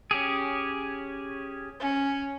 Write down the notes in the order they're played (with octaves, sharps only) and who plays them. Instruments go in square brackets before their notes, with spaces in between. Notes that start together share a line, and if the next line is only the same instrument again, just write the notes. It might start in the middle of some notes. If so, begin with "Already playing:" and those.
[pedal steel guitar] C#4 G4 G#4
[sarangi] C#4